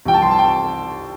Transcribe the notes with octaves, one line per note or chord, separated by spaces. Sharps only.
C2 C3 F3 G5
A5
C6
A5
G5